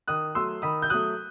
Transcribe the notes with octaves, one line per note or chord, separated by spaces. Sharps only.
D#3 D#6 F#6
F#3 A3 C6 E6
D#3 B5 D#6
G6
F#3 A3 D#6 F#6